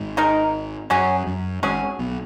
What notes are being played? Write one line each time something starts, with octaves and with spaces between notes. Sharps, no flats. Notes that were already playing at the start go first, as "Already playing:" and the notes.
Already playing: G#1 G#2
G#3 D#4 A#4
F#2 F#3 C#4 G#4
F#2
G#1 G#2 F#3 C#4 G#4
B1 B2